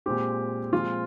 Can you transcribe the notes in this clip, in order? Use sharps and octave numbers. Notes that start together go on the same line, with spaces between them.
A#2 G#3 C4 G4
A#2 F3 G#3 C4 F4